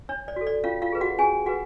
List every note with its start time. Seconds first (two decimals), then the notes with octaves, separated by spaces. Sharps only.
0.09 D4 C#5
0.28 D5
0.36 F#4 A4
0.47 D5
0.64 C#4 F4 F5
0.82 F4 F5
0.92 G#4 B4
1.01 F#4 F#5
1.19 C#4 G#4 G#5
1.46 F#4 G#4 B4 F#5